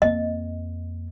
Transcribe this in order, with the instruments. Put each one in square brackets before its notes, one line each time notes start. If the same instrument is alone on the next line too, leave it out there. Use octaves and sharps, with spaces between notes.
[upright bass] F2 A#3 [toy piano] D#5